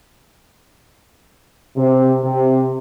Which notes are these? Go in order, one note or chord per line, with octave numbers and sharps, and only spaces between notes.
C3
C3